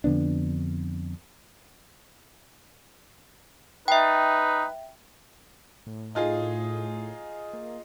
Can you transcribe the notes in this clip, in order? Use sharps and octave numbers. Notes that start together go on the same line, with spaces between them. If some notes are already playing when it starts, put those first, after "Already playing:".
F2 D3 B3 D4
D#4 B4 E5 G5
A2
D#4 F4 G#4
A#3